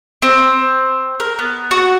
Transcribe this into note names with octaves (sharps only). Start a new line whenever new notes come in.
C4
A#4
B3
F#4